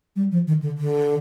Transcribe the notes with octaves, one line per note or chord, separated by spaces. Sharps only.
G3
F3
D#3
D3
D3